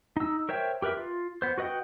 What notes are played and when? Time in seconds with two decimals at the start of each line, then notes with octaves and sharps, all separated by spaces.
0.17 D#4 E6
0.49 A#4 C5 C#5 E5 G5
0.82 G4 A#4 B4 E5
0.97 F4
1.42 B3 C5
1.58 F#4 B4 D#5 F#5 G5